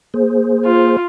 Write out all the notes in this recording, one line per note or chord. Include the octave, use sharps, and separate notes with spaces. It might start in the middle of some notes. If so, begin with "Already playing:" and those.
A#3 G#4 C5
F4